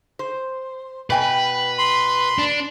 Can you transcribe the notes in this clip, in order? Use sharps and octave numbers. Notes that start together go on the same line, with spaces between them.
C5
B2 B4 G5 G#5
B5 C6
D4